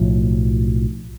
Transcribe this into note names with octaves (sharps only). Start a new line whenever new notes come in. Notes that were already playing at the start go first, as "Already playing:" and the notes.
Already playing: B1 A2 F3